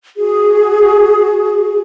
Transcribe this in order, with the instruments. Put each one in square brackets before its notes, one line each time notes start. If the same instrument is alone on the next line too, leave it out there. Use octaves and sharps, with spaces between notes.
[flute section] F#4 G#4